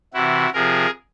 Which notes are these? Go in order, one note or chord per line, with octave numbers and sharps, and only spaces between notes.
C3 E3 E4 F#4
C3 F3 G#4 A#4